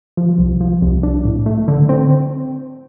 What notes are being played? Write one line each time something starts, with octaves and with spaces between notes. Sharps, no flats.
F3
C2
F3
C2
D4
A2
A3
D3
C4